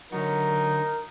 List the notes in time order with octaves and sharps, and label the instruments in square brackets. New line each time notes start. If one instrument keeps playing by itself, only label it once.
[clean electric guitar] D3 F#4 [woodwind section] F#3 [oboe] D#4 [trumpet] A#4